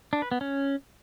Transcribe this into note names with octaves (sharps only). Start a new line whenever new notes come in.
D4
B4
B3
C#4